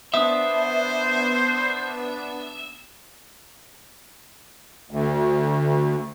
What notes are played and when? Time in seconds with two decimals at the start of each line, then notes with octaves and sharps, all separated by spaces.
0.14 B3 D4 C5 E5 D#6
4.91 D2